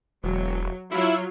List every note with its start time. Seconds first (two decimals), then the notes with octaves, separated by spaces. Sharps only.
0.24 E1 F#3
0.91 F#3 E4 F4